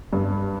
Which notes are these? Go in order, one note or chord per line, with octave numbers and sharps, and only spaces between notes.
G2